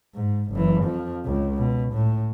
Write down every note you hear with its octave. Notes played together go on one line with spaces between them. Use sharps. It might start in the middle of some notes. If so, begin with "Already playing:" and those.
G#2
F#1 E3
F2 F3
C#2
B2
A2